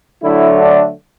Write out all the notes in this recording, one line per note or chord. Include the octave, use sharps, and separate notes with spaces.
D3 F#3 A3 E4
D4